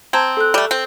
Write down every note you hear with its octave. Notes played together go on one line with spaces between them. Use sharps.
C4 A5 A#5 G#6
A4 F#6
G3 A3
C4